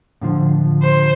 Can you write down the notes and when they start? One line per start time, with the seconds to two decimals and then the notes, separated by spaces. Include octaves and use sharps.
0.21 A2 D3 F3
0.83 C5